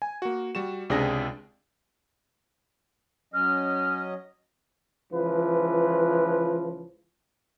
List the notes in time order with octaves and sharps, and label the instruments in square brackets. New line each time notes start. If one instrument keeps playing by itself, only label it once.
[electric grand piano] G#5
A#3 F#4
G3 F#4 E7
C#2 C3 D4 G#4 D5 A#6
[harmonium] F#3 C#4 D#5 [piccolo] F6
[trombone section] C#2 E3 F3 B4